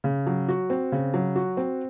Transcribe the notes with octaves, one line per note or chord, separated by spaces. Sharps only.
C#3
F#3
F#4
C4
C#3
F#3
F#4
C4